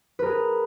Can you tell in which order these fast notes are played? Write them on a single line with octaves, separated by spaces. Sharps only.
B4 A#4 G#4